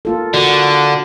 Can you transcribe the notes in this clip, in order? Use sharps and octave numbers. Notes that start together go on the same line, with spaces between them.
A#3 F4 A4
D3 F#4 A#4